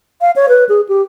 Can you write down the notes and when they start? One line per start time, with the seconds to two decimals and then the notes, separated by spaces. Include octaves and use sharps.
0.21 F5
0.36 C#5
0.49 B4
0.69 G#4
0.89 G4